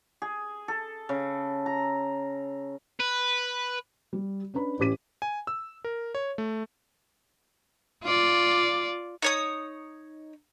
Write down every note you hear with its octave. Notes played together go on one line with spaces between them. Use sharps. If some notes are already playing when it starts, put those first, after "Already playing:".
G#4
A4
C#3
A#5
B4
G3
C#4 D4 B4 B5
A1 C#4 G4 D6 B6 D#7
G#5
E6
A#4
C#5
A3
F4 D5
D#4 C#5 D#6